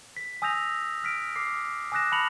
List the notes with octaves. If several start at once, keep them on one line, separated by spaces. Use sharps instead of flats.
B6
G#5 D#6 E6 G6 A#6 F7
F6 B6 D7
D6 F6 C7
G#5 D6 D#6 F#6 A#6 E7
A5 B5 F6 C#7 F7 F#7